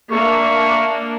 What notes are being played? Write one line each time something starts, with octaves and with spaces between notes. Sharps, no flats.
A#3 D4 E5 C#6